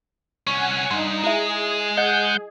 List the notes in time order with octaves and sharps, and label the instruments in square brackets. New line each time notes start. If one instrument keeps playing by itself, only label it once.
[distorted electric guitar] C2 C#4 [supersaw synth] F#5 G#5 [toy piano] C#6
[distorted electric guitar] G2 [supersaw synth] D#4 [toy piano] C6
[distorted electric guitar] G#3 [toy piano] E4 E5 [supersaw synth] G#4
[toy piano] D#5 [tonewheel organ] F#5 G6